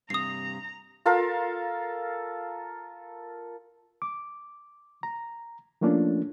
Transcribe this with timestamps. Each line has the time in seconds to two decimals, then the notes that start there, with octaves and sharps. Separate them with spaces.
0.10 G2 C3 A#5 D#6 C7
1.06 F4 A4 A#4 F5
4.02 D6
5.03 A#5
5.81 F3 A3 A#3 C#4 D4 F4